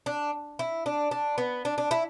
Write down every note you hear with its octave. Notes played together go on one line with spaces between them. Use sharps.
D4
E4
D4
D4
B3
D4
D4
E4